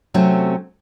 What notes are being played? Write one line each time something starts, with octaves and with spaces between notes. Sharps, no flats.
C3 F#3 A3 C4 C#4